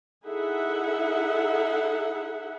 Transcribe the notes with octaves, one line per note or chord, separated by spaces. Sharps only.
D#4 E4 G#4 A4 E5 F#5